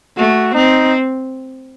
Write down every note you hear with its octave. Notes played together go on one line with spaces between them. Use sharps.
A3 F#4
C4 D#4